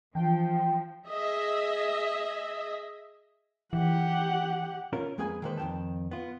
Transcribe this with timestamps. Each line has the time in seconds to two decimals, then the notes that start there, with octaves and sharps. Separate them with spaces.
0.15 E3 F3 G5
1.08 G#4 D#5 E5
3.73 E3 G4 F#5
4.93 C#4 F4 A#4
5.18 F2 G#3 A#3 G#4 B4 G#5
5.42 D#3 G#3 A#3 D#4 B4 C5
5.58 F2 D#3 A3 G5 A5
6.11 B3 F4